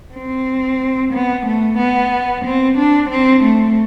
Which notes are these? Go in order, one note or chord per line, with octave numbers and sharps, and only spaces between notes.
C4
B3
A3
B3
C4
D4
C4
A3